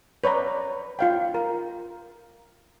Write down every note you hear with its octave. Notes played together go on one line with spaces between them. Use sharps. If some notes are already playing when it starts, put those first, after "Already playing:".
B4 C#5 D5 A#5
F4 F5 G5
A#4